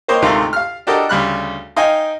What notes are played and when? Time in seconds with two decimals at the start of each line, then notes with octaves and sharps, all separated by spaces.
0.08 A#3 C5 C#5 D#5 G5
0.22 D2 G#2 C3 D#3 A3 F4
0.53 F5 F6
0.87 D4 F#4 G4 A4 A#4 D#5
1.09 D2 C#3 G3 B5 F6 F#6
1.76 D#4 D#5 F5 G5 G#5